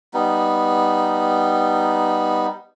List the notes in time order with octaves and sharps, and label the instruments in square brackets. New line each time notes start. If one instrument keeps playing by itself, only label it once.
[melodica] G3 B3 D#4